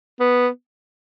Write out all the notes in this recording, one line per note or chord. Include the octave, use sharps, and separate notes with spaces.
B3